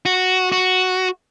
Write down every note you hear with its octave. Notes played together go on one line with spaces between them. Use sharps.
F#4
F#4